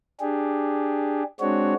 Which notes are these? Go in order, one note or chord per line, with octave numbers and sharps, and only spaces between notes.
D4 G4 G#4
G#3 C4 D4 F#4 C#5